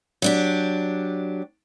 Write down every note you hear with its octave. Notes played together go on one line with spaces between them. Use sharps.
F#3 D4 G4